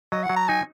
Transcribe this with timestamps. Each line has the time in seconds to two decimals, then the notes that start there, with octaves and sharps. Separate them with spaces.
0.12 F#3 D#5
0.23 F#5
0.29 F#3
0.36 A#5
0.48 D#4 G#5